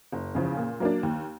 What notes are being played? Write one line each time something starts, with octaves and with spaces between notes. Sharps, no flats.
F#1
E2 C#3 F3
A#2
F#3 A#3 D4
D#2